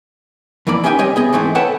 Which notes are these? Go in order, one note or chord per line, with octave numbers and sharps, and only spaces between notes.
F2 E3 A#3 D5 B5
C#4 D#4 G4 E5 G5 G#5
G3 C4 G4 C#5 D#5 G#5
B3 G#4 D#5
G#2 E3 A3 C4 E4
A4 B4 C#5 F#5 G5 A5